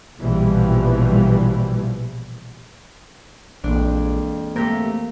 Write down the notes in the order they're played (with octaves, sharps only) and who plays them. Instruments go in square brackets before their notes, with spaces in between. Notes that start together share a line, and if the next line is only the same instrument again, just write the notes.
[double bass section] A#1 B2 E3 F3 G3
[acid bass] A#1 [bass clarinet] F2 [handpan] E3 G#3 A#3 [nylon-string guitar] D4
[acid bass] C3 [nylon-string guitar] A3 G4 A#4 [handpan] A#3